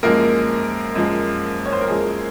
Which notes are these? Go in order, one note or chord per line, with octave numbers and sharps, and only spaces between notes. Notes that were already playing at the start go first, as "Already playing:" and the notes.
F#2 F3 G#3 A#3 A#4
F#2 F3 G#3
C#5
C5
A#4
F#2 F3 G#3 G#4